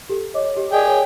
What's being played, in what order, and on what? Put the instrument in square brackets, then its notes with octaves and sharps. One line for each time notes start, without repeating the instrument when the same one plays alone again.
[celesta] G4 A4
C#5 D#5 D6
G4
[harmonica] G#4 G5 [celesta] D5 D#5
[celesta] C#5